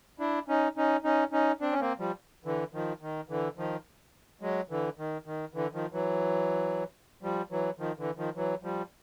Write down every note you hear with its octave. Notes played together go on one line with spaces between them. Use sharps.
D4 E4
C#4 D#4
C#4 D#4
C#4 D#4
C#4 D#4
C4 D4
C#4
A#3 C4
F3 G3
D3 E3
D#3 F3
D#3
D3 E3
D#3 F3
F#3 G#3
D3 E3
D#3
D#3
D3 E3
D#3 F3
E3 F#3
F3 G3
E3 F#3
D#3 F3
D3 E3
D#3 F3
E3 F#3
F3 G3